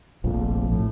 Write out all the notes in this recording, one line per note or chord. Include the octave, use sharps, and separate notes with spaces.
F1 A#1 F2
A2